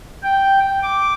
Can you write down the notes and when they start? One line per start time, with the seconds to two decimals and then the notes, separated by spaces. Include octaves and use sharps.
0.22 G5
0.83 D6